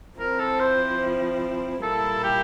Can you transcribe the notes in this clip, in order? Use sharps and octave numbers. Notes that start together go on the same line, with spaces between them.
F3 C4 E4 A#4
A4
C5
A#2 G3 A#3 E4 A4
G4